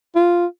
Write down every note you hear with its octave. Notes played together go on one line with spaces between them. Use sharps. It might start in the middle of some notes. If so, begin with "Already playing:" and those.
F4